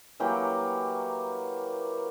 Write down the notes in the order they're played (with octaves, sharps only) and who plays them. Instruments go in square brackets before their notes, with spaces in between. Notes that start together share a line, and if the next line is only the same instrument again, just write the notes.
[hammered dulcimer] E3 F#3 A#3 G4